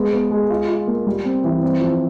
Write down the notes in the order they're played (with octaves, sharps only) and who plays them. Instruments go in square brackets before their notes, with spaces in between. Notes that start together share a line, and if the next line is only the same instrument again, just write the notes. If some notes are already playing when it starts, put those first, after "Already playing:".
Already playing: [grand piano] G#3 B3
B3
G#3
F4
F4
A#3
G3
C4
E3
C4
F3